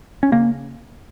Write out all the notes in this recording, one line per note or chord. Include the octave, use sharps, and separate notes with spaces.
C#4
C#3 A#3